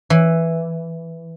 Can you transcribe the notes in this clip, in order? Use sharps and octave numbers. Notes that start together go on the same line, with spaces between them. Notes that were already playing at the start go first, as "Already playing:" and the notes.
E3